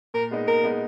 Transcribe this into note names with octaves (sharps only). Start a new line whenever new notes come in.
A#2 A#4
G#3 B3 D#4
A#2 A#4
G#3 B3 D#4